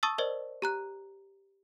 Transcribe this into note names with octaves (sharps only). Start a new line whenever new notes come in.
A5 C#6 D#6 E6 A6
A#4 C5 D5 D#5
G4 A#5 F#6